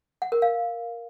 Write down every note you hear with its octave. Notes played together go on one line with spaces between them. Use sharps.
F#5
A#4
F5